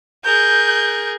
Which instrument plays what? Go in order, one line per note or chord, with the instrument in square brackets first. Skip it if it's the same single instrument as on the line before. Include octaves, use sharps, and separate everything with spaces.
[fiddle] G#4 A#4 [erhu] G6